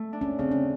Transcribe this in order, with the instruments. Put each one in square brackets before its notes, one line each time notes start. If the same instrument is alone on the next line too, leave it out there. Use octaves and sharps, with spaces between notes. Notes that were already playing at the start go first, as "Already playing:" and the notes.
Already playing: [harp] A3
D4
[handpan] C#4
[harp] C#3 [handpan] C4
[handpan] C#4